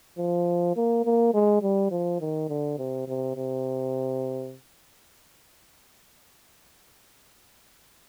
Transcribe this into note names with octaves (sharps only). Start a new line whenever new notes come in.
F3
A#3
A#3
G#3
G3
F3
D#3
D3
C3
C3
C3